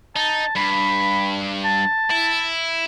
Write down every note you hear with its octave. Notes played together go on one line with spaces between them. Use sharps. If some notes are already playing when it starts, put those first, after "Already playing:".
D#4 A5
G2 B5
A5
E4